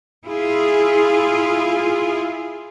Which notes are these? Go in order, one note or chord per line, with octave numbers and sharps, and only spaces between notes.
E4 F4 G#4